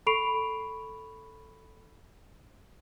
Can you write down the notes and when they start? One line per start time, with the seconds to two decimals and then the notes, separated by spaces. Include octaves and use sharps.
0.06 A4 B5 C#6 C7 D7 F7